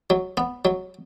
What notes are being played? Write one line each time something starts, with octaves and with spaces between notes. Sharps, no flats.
F#3
B3
F#3